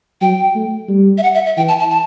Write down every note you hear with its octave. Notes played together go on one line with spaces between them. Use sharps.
F#3 G5
A3
G3
E5
F#5
E5
E5
E3 G5
A5
A5
A5